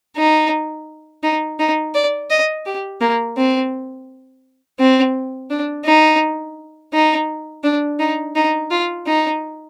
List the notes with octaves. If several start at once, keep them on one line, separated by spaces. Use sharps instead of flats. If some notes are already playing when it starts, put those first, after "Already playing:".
D#4
D#4
D#4
D5
D#5
G4
A#3
C4
C4
D4
D#4
D#4
D4
D#4
D#4
F4
D#4